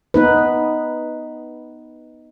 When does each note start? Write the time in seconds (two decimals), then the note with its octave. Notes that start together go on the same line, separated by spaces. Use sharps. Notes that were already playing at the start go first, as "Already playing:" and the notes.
0.14 B3 D#4 B4